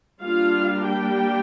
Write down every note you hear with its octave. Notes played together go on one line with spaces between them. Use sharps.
G3 A#3 D4 F4 F5
G4 G5